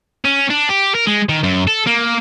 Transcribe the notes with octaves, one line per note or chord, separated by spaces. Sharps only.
C#4
D4
G4
A#4
G#3
D#3
F#2
A4
A#3